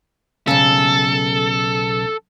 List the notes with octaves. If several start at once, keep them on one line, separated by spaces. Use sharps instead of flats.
B1 G#2 C#3 A4